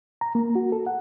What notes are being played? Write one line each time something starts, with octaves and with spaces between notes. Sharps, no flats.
A#5
A#3
F#4
A4
F#5